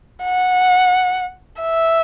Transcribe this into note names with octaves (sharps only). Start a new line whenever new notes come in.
F#5
E5